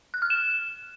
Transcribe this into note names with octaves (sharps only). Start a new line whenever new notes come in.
F#6
F6
E7